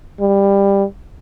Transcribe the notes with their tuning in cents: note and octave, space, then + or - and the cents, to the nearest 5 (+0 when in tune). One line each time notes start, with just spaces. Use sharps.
G3 +15